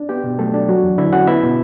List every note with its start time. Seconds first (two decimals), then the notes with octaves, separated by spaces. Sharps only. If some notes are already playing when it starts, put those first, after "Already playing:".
Already playing: D4
0.09 B3 G4 G5
0.24 B2
0.38 F#3 A3 A4
0.54 D4
0.68 F#3 F#4
0.83 E2
0.98 D3 E4 E5
1.13 C#4 F#4 F#5
1.27 B3 E4 E5
1.43 B2